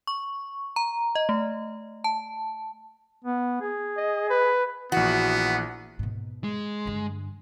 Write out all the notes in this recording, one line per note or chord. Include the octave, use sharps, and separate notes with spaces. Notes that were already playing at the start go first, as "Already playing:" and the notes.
C#6
A#5
D#5
A3
A5
B3
G#4
D#5
B4
A#1 E3 B3 F#4
G#2 B2
G#3
G2 D3